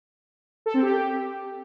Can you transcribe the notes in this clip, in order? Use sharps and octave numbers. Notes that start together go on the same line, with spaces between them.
A4
C4
G4